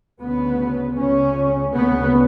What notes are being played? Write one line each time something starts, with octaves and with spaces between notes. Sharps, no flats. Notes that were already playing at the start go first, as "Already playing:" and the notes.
D2 C#3 B3
C#2 C#3 C#4
D2 C#3 B3